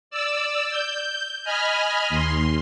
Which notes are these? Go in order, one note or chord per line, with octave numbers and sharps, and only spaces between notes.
D5 E6
G6
D#5 G#5 B5 F6
D#2 C6